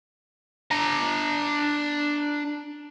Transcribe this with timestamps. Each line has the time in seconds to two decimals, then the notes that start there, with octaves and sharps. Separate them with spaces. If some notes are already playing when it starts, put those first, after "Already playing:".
0.71 D4 A#5